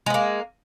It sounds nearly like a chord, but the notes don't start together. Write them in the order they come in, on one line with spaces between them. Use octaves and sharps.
G#3 B3 A#3